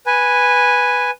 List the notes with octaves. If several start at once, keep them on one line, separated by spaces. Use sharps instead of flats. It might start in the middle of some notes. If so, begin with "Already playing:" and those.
B4 G#5